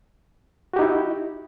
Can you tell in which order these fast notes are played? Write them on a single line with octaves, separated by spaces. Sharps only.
F#4 G4 D#4 E4